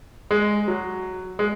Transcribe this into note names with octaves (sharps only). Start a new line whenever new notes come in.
G#3
F#3
G#3